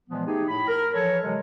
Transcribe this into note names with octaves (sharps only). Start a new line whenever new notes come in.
A#2 E3 F3 G#3 B3
A3 D#4 G4 G#4
A2 B5
A#4
E3 F3 A4 A#4 C#5
C3 E3 F#3 G#3